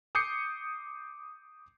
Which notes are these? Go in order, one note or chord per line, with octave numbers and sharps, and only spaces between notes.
D6 D#6 G6 C7 C#7